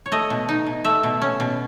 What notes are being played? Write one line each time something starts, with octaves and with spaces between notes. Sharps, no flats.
C#5
A3 D#5
B2
D#4
B2
A3 E5
B2
C#4
B2